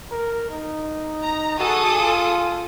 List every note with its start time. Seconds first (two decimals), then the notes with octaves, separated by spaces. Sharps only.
0.11 A#4
0.50 D#4
1.22 A#5
1.59 F#4 G#4 A4 D#6
1.98 F4